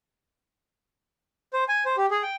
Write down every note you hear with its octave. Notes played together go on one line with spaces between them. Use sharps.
C5
G#5
C5
G4
G#4
G5